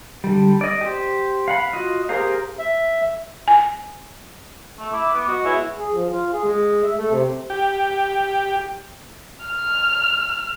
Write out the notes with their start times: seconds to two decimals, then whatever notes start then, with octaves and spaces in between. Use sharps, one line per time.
0.24 D3 G3
0.61 D5 D#5
0.81 G4 C5
1.48 F5 F#5 B5
1.73 F4 F#4 D#5
2.09 G4 G#4 A#4 C5 F5
2.59 E5
3.48 G#5
4.79 A3
4.93 E4 D6
5.13 B3
5.28 F#4 D#5
5.44 G#3 B3 E4 C#5
5.77 G#4
5.94 F3
6.10 F4
6.33 G#4
6.44 G#3
6.84 E5
6.97 A3
7.11 C3
7.50 G4
9.46 F6